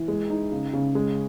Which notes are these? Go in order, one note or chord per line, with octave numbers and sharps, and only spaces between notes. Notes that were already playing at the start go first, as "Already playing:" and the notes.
Already playing: E3
G#3
D#4
C#3
C#3
G#3